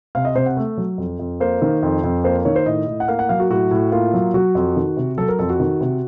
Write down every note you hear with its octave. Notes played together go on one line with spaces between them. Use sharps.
C3 F5
D#5
C3 C5
F#5
A3
F#3
F2
F2
A#3 C5
D#3
F2
F2
A#3 C5
D#3 C#5
C5
A2 D#5
A2
F#5
A#3 F5
F#5
F#3 F5
F#4
A2 F#4
A2
A#3 F4
F#3
F#3 F#4
F2
D#3
C3
F#3 A4
A#4
F2 A4
F#4
D#3
C3